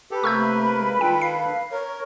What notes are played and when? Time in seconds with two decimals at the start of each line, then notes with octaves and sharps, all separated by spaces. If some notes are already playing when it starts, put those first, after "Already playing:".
0.11 G4 A4 B4
0.24 C3 A3 A#3 A#4 C#6 E6 G6
0.80 G#3
1.01 D#3 D4 F4 A4 G5
1.21 F5 C7
1.71 A#4 C#5